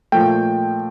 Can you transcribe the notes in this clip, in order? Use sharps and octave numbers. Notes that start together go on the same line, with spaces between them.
A#2 F3 A3 G5